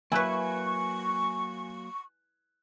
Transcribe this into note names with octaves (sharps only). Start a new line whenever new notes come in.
F#3 A#3 E4 B4 G#5 C#6 F#6